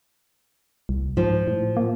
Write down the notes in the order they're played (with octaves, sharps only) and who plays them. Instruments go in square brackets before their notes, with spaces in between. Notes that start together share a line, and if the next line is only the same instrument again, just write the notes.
[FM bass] C2
[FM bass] G#2 [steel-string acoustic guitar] F3
[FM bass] A2
A#3